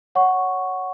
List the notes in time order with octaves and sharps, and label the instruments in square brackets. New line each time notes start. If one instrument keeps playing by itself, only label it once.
[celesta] C#5 F#5 C#6